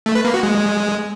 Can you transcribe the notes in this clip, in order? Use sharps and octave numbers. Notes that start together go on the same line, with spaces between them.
A3
B4
A#3
F#4
G#3